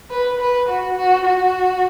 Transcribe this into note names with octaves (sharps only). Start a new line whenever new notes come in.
B4
B4
F#4
F#4
F#4